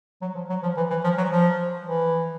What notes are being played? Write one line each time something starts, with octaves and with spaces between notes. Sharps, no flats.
F#3
F3
F#3
F3
E3
E3
F3
F#3
F3
E3